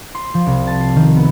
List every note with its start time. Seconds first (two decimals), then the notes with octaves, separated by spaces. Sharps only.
0.15 C6
0.34 F3
0.47 C2
0.67 A5
0.80 C7
0.96 D#3
1.16 B3